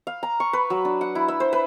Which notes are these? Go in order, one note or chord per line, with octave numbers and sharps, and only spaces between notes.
F5
A#5
C#6
B4
F#3
D4
F#5
E4
E5
C5
B4